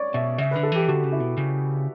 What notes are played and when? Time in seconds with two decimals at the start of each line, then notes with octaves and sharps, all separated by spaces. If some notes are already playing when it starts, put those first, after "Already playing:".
Already playing: C#5 D5
0.14 B2 E5
0.38 C#3 E5
0.51 D3 B4
0.63 A4
0.72 E3 G4
0.88 D3 F#4
1.04 C#3
1.12 E4
1.20 B2
1.37 C#3